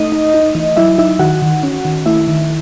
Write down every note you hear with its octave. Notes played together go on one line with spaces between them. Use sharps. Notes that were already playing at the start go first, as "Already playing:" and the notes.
Already playing: A3 D#4 D#5
D#4
D#4
E3
F#3 E4 E5
D#4 E4 E5
D#3 F#4 F#5
D#3
C#4
D#3
A3 E4 E5
D#3